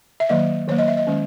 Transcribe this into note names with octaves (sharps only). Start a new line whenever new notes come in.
E5
D#3 F#3 A#3 D#5
D#3 F#3 A#3 C#5
D#5
E5
D#5
D#3 G#3 C#4